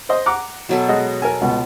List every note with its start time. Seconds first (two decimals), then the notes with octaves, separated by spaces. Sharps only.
0.09 C5 D#5
0.26 F#5 A#5 D6
0.69 B2 F#3 A4
0.88 G#3 F#4 D#5
1.22 A4 A#4 G#5
1.41 C#2 B2